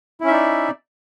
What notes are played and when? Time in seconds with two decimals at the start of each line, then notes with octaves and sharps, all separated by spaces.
0.21 E4
0.24 C#4
0.27 E5
0.30 D#4
0.33 D5